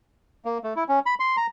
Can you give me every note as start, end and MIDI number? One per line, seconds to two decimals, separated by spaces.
0.45 0.58 58
0.64 0.73 57
0.76 0.84 64
0.89 0.99 61
1.06 1.14 83
1.20 1.36 84
1.37 1.46 82